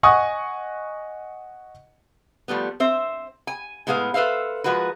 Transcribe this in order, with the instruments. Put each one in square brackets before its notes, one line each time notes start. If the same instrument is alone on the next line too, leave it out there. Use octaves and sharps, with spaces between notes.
[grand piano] D#5 F#5 G#5 C#6 D#6
[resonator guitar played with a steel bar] F3 G3 A3 B3
C4 C5 E5
G#5
A2 G#3 B3 G#4 F5
A4 B4 C5 E5 F5
F3 G#3 F#4 A#4 B4